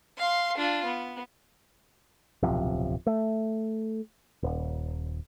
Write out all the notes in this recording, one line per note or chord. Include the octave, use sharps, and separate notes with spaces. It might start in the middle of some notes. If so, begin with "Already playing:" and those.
F5 C6
D4 F4
B3
D1 B1 C3 F3
A3
D#1